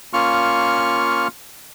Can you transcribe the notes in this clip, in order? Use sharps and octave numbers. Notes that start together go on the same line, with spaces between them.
A#3 C#4 F4 C#6 F6